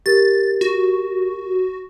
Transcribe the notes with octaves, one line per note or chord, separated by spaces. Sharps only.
G4 A#4 A6
F#4